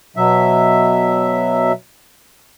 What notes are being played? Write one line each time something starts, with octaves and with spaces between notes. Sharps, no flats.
B2 F#3 E5